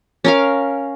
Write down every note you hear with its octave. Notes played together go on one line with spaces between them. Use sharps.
C#4 A#4 F5